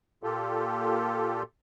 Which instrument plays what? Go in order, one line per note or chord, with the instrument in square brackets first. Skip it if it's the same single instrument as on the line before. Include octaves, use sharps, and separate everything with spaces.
[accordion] A#2 F4 G4 A4